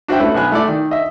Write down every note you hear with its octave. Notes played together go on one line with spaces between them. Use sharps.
D4 F#4 C5 E5 G5
A3 C#4 E4 B4
B1 B3 G#5 F#6
A3 E4 D5
D#3
D#5 E5